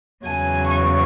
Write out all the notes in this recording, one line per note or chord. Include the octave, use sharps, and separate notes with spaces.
E2 C#3 F#3 G#5
C#6